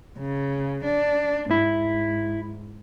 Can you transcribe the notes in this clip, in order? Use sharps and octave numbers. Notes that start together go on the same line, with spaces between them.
C#3
D4
G#2 E4